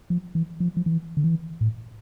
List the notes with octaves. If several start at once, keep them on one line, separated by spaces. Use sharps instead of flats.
F3
E3
F3
F3
E3
D3
E3
A2